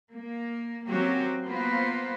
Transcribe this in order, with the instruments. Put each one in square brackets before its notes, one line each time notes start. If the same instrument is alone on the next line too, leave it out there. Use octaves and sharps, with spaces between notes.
[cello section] A#3
F#3 A#3 C4 C#4 F#4 G4
A#3 B3 F4 B4 C5